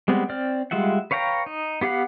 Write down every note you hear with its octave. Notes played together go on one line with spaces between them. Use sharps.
G3 G#3 B3 C4
C4 D5 F6
G3 G#3 F4 E5 F#5
B4 C#5 F5 G5 A#5
D#4
B3 G4 F5 F#5